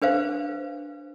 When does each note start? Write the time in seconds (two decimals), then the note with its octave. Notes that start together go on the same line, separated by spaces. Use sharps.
0.02 D4 B4 C5 F5